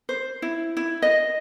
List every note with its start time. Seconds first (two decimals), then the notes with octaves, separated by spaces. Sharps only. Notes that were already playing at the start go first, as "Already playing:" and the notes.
0.09 C5
0.42 E4
0.77 E4
1.02 D#5